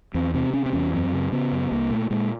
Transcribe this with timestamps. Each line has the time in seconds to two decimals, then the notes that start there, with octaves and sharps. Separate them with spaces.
0.14 E2 C4
0.34 C3 C4
0.53 C3 C#4
0.66 C4
0.73 E2 C#4
0.93 F#2 C4
1.13 C#3
1.32 C#3 B3
1.52 F#2
1.71 C2 A#3
1.90 A#2 A3
2.10 A#2 G#3